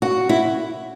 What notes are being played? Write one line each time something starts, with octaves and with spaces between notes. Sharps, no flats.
F#4
E4